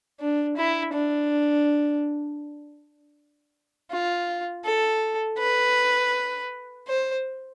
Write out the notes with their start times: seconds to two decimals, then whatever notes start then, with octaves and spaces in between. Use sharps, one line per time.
0.20 D4
0.57 E4
0.94 D4
3.91 F4
4.65 A4
5.39 B4
6.87 C5